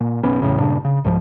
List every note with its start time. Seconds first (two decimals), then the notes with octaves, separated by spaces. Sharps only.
0.01 A#2
0.23 F#1 B1 B3 C#4
0.42 B1 E2 A2 C#3
0.59 G2 A#2 C#3 D4
0.85 C#3
1.04 C2 G#2 E3 F3